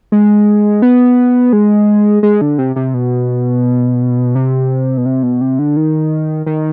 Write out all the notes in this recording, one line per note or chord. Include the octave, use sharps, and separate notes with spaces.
G#3
B3
G#3
G#3
D3
C3
C3
B2
C3
B2
C3
B2
C3
D3
D#3
D#3